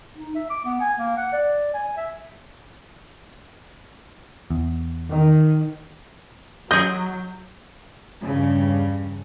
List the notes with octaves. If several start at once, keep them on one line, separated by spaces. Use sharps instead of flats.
D#4
E5
D6
B3
G#5
A#3
F#5
D5
G#5
E5
E2
D#3
F#3 G#4 D#5 G6
E2 G2 C#3